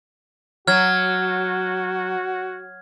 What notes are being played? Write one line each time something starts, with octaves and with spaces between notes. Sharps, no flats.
F#3 F#4 F6 G#6